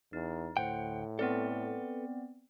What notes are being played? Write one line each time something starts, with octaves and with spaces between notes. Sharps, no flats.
E2 D#4
D2 A2 C#3 C5 F#5 G5
B3 C4 A4 B4 D5